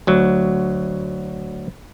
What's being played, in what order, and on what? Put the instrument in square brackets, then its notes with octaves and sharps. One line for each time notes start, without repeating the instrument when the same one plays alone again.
[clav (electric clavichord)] D2 F#3